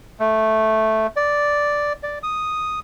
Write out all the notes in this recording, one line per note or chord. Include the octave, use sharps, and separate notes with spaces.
A3
D5
D5
D#6